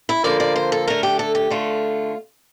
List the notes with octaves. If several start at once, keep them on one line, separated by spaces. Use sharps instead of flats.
E4
D3 F3 A#3 D5
D5
C5
A4
D3 A3 A#4
G4
A4
G4
D3 A3 F4